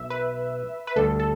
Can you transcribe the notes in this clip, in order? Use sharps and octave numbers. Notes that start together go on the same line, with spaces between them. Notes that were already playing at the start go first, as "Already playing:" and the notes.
Already playing: B1 B2 E5
B4
B4
D2 D3 G3 D4 G4 A4
A4